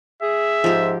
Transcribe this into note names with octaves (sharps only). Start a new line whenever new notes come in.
G#4 E5
G#2 F3 G4